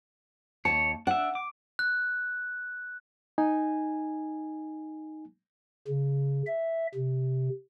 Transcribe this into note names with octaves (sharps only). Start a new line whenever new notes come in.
D#2 C#5 A5
D4 E5 F#5
D6
F#6
D#4 G#5
C#3
E5
C3